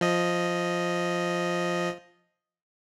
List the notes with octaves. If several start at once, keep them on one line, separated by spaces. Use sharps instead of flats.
F3 D#5